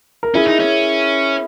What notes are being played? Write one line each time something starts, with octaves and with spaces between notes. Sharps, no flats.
A#4
C#4 E4 G#4
D#4
C#4